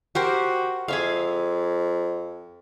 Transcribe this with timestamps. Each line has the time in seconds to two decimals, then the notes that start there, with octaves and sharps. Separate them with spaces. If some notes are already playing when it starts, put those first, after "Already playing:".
0.15 F#4 G4 A#4 C5
0.88 F2 G#4 E5 F5